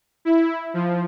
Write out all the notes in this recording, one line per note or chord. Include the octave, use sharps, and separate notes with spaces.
E4
F3